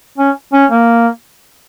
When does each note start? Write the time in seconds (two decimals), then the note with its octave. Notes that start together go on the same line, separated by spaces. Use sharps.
0.18 C#4
0.53 C#4
0.70 A#3